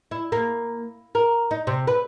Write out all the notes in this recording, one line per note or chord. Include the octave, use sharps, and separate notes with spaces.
E4
A#3
A#4
D#4
C3
B4